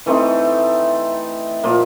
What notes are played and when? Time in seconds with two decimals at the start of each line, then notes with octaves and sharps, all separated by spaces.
0.06 E3 A3 C4 D#4
1.63 A#2 F3 A#3